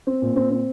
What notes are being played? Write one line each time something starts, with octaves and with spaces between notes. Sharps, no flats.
C4
A#2
C4
C4